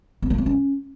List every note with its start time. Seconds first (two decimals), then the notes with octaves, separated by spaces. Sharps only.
0.22 B3
0.30 A#3
0.38 B3
0.46 C#4